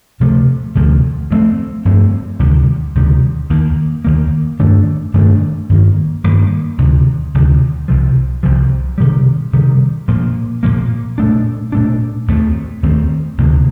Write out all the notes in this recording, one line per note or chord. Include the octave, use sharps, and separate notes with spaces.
D2 C3 F3 A3
D2 C3 F3 A3
G2 F3 A3 C4
G2 F3 A3 C4
D2 C3 D#3 G3
D2 C3 D#3 G3
D#2 D#3 A#3
D#2 D#3 A#3
G2 D#3 A3 D4
G2 D#3 A3 D4
G2 D#3 A#3
G2 D#3 A#3
D2 C3 D#3
D2 C3 D#3
C2 C3 F3
C2 C3 F3
C3 D#3 G3
C3 D#3 G3
A#2 F3 A#3
A#2 F3 A#3
A#2 A3 D4
A#2 A3 D4
D#2 D#3 A3 C4
D#2 D#3 A3 C4
D2 C3 D#3 A#3